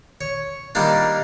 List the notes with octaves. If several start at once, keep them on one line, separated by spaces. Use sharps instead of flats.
C#5
D#3 G3 A#3 D4